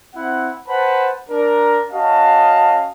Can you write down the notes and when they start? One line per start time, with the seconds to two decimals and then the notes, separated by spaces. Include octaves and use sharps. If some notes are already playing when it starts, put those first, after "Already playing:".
0.16 C4 E4 F#5
0.68 B4 C5 F#5 A5 B5
1.30 D4 A#4
1.92 C#4 F#4 D#5 F5 A5